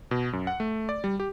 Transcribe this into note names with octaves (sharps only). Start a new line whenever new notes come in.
B2
F#2
F#5
A3
D5
G3
G4